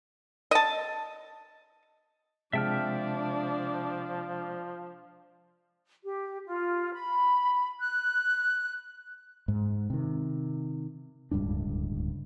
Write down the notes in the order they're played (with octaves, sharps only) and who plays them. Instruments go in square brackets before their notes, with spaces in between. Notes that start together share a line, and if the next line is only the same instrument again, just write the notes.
[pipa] D#5 A5
[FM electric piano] C3 G#3 A5 [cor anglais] F3 [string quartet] D4 [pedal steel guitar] E5 G5 F6
[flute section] G4
F4
B5
F#6
[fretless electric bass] G#2
C3 D#3
D1 C#2 G2 D4